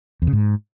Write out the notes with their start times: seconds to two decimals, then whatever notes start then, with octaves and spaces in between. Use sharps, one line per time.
0.22 E2
0.27 C#3
0.33 G#2